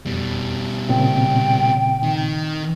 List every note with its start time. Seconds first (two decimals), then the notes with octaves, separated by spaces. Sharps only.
0.06 F2 B2 G3
0.89 A#2 C#3 C4 G5
2.03 D#3